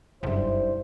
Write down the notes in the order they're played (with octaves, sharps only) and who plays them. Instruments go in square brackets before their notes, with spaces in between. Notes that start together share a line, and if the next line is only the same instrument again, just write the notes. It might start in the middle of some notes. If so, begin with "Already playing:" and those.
[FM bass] F#1 [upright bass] B1 G2 [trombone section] G3 E4 C5